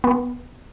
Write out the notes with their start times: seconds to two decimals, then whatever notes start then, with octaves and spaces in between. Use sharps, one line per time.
0.04 B3